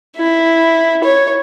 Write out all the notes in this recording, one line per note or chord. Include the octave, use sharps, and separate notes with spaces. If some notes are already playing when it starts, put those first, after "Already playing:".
E4
C#5